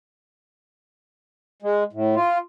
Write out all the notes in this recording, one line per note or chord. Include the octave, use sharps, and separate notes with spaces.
G#3
A2
F4